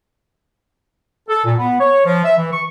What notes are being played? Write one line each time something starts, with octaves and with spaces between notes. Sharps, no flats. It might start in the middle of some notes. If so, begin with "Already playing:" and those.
A4
A#2
B3
C#5
F3
E5
E3
C#6